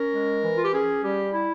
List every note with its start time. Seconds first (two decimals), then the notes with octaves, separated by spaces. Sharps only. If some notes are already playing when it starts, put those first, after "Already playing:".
Already playing: C#4 A#4
0.12 G#3
0.43 E3
0.55 F4
0.63 G4
0.72 C#4 G#4
1.02 G3 G4
1.33 E4